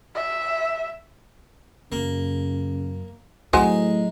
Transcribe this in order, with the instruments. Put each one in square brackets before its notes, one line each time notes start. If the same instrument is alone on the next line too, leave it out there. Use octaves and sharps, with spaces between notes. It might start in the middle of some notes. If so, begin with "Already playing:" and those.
[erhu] E5
[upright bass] F#2 [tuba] C#3 [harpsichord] A#3
[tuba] A2 [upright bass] F#3 C4 [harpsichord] G#3 D#4 [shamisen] F#4 C5 G#5